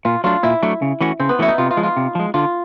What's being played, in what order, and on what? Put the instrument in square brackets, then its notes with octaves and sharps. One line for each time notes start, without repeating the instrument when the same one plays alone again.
[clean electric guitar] A#2 [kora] F4
[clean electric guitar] F#3 A3 D4 [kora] F4
[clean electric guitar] A#2 [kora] E4
[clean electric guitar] F#3 A3 D4
C#3
E3 A3 C#4 F#4
[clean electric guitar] C#3 [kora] C4
[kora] B3
[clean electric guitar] E3 A3 C#4 F#4 [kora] E4
[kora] D#4
[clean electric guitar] C3 [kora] F4
[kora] F4
[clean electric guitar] F3 G#3
[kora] F4
[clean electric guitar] C3
F3 G#3
[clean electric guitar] D3 [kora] F4